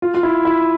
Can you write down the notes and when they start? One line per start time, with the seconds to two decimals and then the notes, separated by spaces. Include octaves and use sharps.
0.02 F4
0.14 F4
0.23 E4
0.45 E4